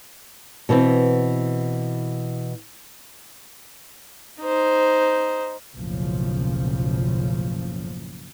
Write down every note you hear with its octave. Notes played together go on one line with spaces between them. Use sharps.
B2 E3 B3 C4
D#4 C5
F#1 B1 A2 C#3 F3